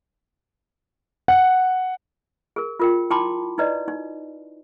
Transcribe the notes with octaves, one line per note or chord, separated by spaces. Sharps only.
F#5
G#4 A#4
F4 A#4 G5
E4 G5 A5 B5 C6 D6
D#4 E4 B4 D5 D#5
D#4